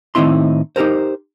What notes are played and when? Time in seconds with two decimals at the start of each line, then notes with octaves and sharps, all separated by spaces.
0.15 A2 D#3 C4 D#4 E4 C6
0.76 D#4 G4 G#4 A#4 C5